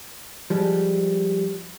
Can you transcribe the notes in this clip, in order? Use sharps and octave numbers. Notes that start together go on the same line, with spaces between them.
F3 G3 G#3